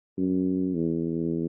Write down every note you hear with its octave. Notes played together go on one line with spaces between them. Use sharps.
F#2
E2